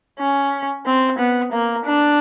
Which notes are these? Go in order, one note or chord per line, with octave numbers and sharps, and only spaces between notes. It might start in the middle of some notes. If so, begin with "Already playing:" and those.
C#4
C4
B3
A#3
D4